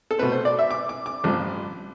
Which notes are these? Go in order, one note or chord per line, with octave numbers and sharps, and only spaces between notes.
A4
B2 A3 C4 B4
C5
D5
E5
D6
D6
D6
A1 G2 F3 C4